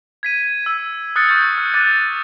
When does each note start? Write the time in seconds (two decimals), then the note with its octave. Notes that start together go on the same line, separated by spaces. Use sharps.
0.23 G#6 B6 D#7
0.66 E6
1.16 D#6 F6 F#6 A6 C#7
1.29 C#6 F6 G6
1.58 F6
1.74 D6 F#6 A6 D#7